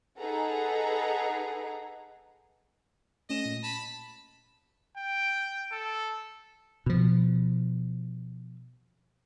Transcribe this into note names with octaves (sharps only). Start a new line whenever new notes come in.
D#4 G#4 A4 B4 F#5 A#5
A3 C#4 D#5 E7
A#2
A5 B5
G5
A4
B2 F3